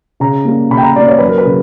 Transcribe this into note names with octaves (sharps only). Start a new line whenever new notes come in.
C#3 A#5
G3 A#3
C#3 B5
G5
A#5
G3 A#3 D5
C#5
F#2 B4
A#4
B4
C#3 F#3